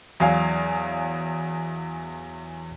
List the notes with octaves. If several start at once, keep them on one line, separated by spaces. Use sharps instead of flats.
E2 F#3 F5 G#5